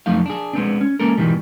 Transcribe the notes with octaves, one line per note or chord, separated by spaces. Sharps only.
F2 F#3 A3 D#4 F5
D4 G#4
G#3 B3 C4 D4
C#4
G#3 A#3 C#4 A4 A#4
G#2 B2 D#3 E3 G3